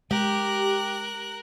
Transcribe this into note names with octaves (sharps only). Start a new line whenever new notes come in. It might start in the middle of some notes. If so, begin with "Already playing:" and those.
G#3 G4 A#4 F#6